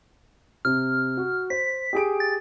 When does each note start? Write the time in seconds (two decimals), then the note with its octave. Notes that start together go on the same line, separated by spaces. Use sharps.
0.65 C3 F6
1.17 F#4
1.50 C5 B6
1.93 G4 G#4 D7
2.20 A6